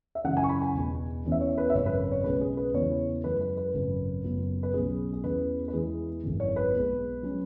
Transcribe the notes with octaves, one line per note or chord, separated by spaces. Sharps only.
E5
F#2 C#3 E3 C#4 F#5
G#5
C#6
B5
G#5
E1 E2 B2
E2 E3 C#4
E5
C#5
B4
E5
G#1 F#2 C#3 C#5
B4
B4
C#5
B1 B2 G#3 C#4 B4
G#4
B4
E2 C#3 E3 C#5
F#2 E3 G#3 B4
B4
B4
G#1 F#2 C#3
F#1 F#2 F#3 B3
B4
B1 B2 F#3 C#4 G#4
G#4
E2 E3 C#4 B4
B4
E2 E3 G#3 G#4
G#1 F#2 E3
C#5
B4
B1 B2 G#3
F#3 C#4